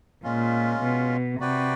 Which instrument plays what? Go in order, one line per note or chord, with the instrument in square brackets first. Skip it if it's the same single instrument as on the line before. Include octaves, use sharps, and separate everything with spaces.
[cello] A#2 [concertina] G#3 C#4 F4
[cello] B2
[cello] C3 [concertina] F#4 B4 D5 G5